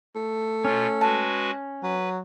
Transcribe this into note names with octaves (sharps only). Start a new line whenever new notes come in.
A3
B2 C#4 F4
G#3 F#4 B4 A5
F#3 B4